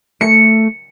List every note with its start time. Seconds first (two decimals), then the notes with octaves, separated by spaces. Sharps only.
0.21 A3 C#7